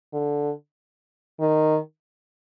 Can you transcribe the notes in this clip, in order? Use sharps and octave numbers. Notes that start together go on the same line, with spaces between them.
D3
D#3